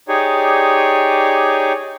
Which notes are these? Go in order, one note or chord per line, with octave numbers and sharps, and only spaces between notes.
D#4 G4 G#4 C#5 D5